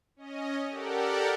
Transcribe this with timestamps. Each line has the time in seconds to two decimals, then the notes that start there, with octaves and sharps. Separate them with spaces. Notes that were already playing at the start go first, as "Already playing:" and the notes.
0.16 C#4 D#5
0.68 G4 A4 A#4 D5 F#5